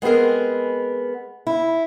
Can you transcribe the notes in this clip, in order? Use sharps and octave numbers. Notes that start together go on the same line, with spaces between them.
G#3 B3 C4 G#4 A#4
E4